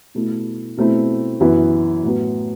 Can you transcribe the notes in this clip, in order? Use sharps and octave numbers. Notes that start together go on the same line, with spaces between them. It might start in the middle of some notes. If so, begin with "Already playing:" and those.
B2 A3 E4
B2 A3 C4 E4
F#2 E3 B3 E4
A2 F#3 B3